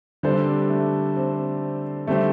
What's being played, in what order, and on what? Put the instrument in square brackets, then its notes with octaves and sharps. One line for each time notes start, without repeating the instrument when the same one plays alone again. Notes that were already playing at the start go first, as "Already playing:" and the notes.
[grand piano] D3 G3 D4 A4 C5 [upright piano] C4
[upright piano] A3
C4
[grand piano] D3 G3 C4 G4 C5 [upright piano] A3